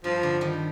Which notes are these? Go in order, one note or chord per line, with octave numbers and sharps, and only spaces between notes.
G2 F3
D3
D#3 G3